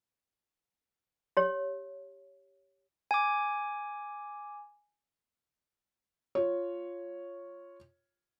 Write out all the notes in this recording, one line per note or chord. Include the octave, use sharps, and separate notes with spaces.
G4 C#5
G#5 D6
F4 C#5